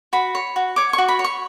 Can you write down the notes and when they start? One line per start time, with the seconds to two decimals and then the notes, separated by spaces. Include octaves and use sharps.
0.13 F#4 B5
0.35 C#5
0.56 F#4
0.76 C#5 D6
0.93 F#4 C#6
1.08 B5
1.19 C#5
1.24 C#6